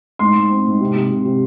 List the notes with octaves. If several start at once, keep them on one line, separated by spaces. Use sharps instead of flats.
G#2 C6
G#2
C4
G#2
C3
C3
C3
C3